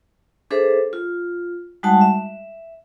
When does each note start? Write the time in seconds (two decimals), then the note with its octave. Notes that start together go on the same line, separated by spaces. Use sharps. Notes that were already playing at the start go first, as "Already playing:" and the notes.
0.51 D4 G#4 A4 B4 C5 E5
0.93 F4
1.83 G3 G#3 D#4 F#4 F#5 A5
2.01 E5